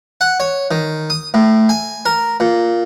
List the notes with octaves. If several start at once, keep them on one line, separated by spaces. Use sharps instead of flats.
F#5
C#5
D#3
D#6
A2
G#5
A#4
A#2